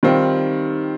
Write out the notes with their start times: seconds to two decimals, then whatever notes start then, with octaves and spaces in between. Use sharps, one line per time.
0.03 D#3 G3 C4 F4